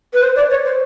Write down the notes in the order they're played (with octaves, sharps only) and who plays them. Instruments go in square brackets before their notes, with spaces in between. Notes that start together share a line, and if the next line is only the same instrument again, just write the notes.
[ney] B4
C5
D5
C#5
C5